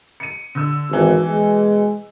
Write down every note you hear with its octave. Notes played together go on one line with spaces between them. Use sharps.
C#7 D#7
D3 E6
G#1 B2 E3
G#3